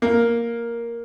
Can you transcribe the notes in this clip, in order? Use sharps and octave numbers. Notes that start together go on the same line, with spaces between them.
A#3